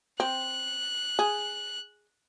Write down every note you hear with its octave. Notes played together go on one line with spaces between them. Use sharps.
C4 F#6
G#4